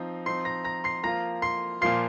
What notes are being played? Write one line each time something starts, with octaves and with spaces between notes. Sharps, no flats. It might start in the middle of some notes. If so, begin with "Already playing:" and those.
Already playing: F3 C4 D#4
F3 C4 D#4 C6 C7
A#5 A#6
A#5 A#6
C6 C7
F3 A#3 F4 A#5 A#6
C6 C7
A#2 F3 A#3 F4 C6 C7